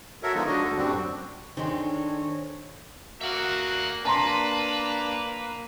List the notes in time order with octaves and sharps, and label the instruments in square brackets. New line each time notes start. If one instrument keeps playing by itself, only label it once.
[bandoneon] F#4 A4 A#4 C#5 E5
D3 F3 G#3 B3 D#4 F4
D3 G#3 D4 F#4 D#5
D2 A4
F#2 A2 G3 C4 D4 F#4
[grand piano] D#3 [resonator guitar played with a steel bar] G#3 C4 [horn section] D4 A4 C#5
[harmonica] A#3 F#4 [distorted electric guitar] E5 F#5
[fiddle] A#3 [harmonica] D4 [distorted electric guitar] B4 [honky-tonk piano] A5 A#5 C6